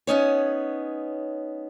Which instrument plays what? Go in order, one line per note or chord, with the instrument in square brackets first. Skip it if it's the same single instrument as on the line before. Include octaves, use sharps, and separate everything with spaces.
[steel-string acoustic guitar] B3 C#4 D#4 C#5